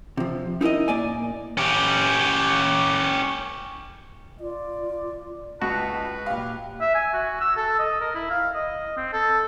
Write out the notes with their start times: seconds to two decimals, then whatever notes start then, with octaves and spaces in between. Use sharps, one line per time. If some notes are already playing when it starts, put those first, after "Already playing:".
0.17 C3 F3
0.61 D#4 E4 G#4 A#4 D#5
0.88 A#2 A#3 D5 G#5
1.57 C#4 G4
4.40 F4 D5
5.62 C#2 F#4 B4 A5
6.26 A#2 G4 F5
6.82 E5
6.95 G#5
7.14 F#4
7.41 E6
7.57 A4
7.79 D#5
8.01 A#4
8.15 E4
8.31 F5
8.55 D#5
8.97 C4
9.13 A4